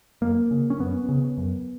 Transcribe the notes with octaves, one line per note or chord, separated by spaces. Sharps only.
F#2 A#3
C#3
C#4
F#2 B3
C#3
F#2